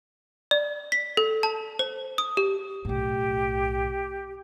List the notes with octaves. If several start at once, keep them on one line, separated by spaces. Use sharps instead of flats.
D5
B6
A4
A5
C5
D#6
G4
B1 A2 G4